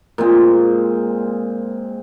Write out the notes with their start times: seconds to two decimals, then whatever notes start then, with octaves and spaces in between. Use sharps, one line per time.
0.18 A#2 G#3 C4